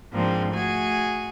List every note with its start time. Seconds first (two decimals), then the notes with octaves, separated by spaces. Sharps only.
0.13 G#2 F3 G#3 A#3 C4 D4
0.51 A3 F#4 G#4 G#5